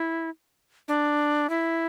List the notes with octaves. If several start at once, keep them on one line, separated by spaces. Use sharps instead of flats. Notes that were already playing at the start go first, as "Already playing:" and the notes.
Already playing: E4
D4
E4